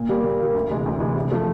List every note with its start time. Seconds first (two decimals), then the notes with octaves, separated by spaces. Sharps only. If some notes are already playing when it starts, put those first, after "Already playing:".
Already playing: A#2
0.09 G3 A#3
0.24 A#2
0.39 G3 A#3
0.55 D2
0.70 C3 E3 G#3
0.86 D2
1.00 C3 E3 G#3
1.16 C3
1.32 F3 A3